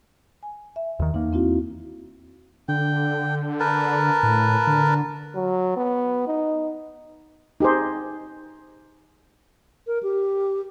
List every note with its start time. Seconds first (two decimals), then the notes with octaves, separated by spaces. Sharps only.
0.43 G#5
0.76 E5
0.99 D#2 D#3
1.14 E2 A#3 D#4
1.33 C4 E4 F#4
2.68 D3 G5
3.60 A#4 B4 A5
4.23 A2
4.67 D3
5.35 F#3
5.77 B3
6.27 D#4
7.60 D#4 G4 G#4 C5
9.87 A#4
10.03 G4